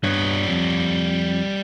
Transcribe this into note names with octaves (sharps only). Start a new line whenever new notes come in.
G2 G3 B3 C#5
F2